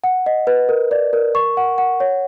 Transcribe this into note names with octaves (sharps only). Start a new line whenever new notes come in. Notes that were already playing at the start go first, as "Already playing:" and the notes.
F#5
D#5
B4
A#4
D5
A#4
C#6
F#5
F#5
C#5